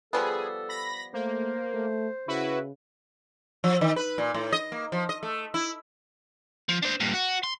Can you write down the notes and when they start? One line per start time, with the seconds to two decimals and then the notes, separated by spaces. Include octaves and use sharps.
0.13 F3 G3 B3 G#4 A4
0.69 B5 A#6
1.13 A3 A#3 C5
1.74 A3
2.28 C#3 E4 F#4 B4
3.64 F3
3.81 D#3
3.96 B4
4.18 A#2
4.34 A2
4.52 D#5
4.72 A#3
4.92 F3
5.09 D#5
5.23 A3
5.54 E4
6.69 F3
6.82 D4 C5
7.00 G2 A#2
7.14 F#4
7.43 C6